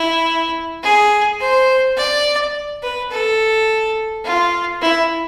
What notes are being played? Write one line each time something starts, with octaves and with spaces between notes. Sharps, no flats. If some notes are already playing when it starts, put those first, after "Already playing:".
Already playing: E4
G#4
C5
D5
B4
A4
F4
E4